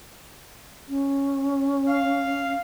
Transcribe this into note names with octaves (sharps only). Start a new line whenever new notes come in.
C#4
F5